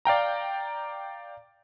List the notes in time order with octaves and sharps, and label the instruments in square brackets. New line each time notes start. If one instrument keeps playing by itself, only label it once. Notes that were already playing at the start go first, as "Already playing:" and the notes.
[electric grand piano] D5 F5 G5 A#5